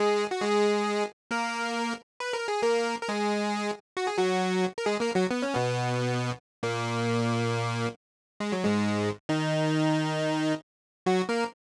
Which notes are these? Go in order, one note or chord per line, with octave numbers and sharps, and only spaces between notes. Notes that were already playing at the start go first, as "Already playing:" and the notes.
Already playing: G#3 G#4
F#4
G#3 G#4
A#3 A#4
B4
A#4
G#4
A#3 A#4
A#4
G#3 G#4
F#4
G#4
F#3 F#4
A#4
G#3 G#4
A#3 A#4
F#3 F#4
B3
C#4
B2 B3
A#2 A#3
G#3
F#3
G#2 G#3
D#3 D#4
F#3 F#4
A#3 A#4